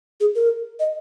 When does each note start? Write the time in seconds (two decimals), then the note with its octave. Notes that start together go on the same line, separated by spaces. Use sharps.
0.20 G#4
0.35 A#4
0.80 D#5